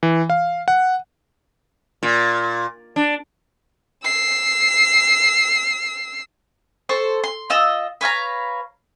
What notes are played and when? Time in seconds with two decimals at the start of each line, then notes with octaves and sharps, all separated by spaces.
0.03 E3
0.30 F5
0.68 F#5
2.03 A#2
2.96 D4
4.04 E6 C7
6.89 A4 C5 C#6
7.24 C6
7.50 F4 D#5 E6
8.01 B4 C#5 F5 A#5